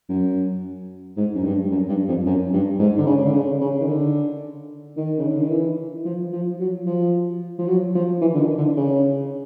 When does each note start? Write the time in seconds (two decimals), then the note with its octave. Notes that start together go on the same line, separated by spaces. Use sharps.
0.09 F#2
1.17 G#2
1.35 F#2
1.45 G2
1.71 F#2
1.89 G2
2.08 F2
2.26 F#2
2.53 G2
2.80 G#2
2.98 D3
3.07 C#3
3.26 D3
3.34 C#3
3.61 C#3
3.81 D#3
3.88 D3
4.97 D#3
5.19 C#3
5.29 D3
5.40 D#3
5.51 E3
6.05 F3
6.33 F3
6.60 F#3
6.86 F3
7.59 F3
7.67 F#3
7.95 F3
8.22 E3
8.34 D3
8.40 D#3
8.58 D3
8.77 C#3